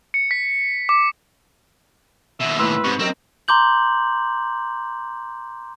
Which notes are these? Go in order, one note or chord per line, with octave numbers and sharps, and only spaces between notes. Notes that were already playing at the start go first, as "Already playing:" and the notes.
C#7
B6
D6
D#2 B2 E5
A2 B4 C6 E6
G#2 C3 C#6
F#2 C4 A#4 D#5
A#5 C6 D6 G6 F#7